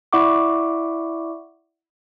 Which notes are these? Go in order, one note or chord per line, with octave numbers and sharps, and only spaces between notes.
E4 D5 E5 F#5 C#6 D6